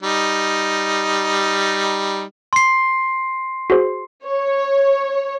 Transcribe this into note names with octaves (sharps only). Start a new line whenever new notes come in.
G3 D#4
C6 C7
F#4 G#4 C5
C#5